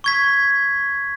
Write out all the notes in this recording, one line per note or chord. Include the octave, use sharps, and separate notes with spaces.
C#6 G#6 B6